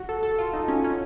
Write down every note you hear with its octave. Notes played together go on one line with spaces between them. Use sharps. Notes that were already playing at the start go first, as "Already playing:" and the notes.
Already playing: F#4
A4
A4
F4
D#4
C#4
C#4